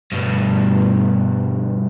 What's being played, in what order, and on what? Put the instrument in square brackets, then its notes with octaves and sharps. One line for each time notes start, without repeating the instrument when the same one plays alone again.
[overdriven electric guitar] G2 B2